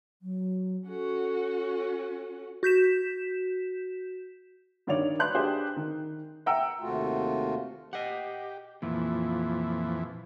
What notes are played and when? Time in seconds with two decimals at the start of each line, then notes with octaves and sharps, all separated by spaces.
0.22 F#3
0.88 C#4 F#4 A4
2.63 F#4 G6 B6 E7
4.87 G2 D#3 C#5 D5 F7
5.19 B4 D5 A5 C6 F#6
5.34 D4 G4 G#4 C5
5.76 D#3
6.46 E5 F#5 G5 A#5 E6
6.79 D#2 C3 A3 F4 F#4
7.93 G4 D#5 F#5
8.82 F2 A#2 E3